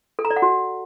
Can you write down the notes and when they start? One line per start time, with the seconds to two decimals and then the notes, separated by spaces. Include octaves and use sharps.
0.19 A4
0.25 A#5
0.31 D5
0.36 F#5
0.42 F#4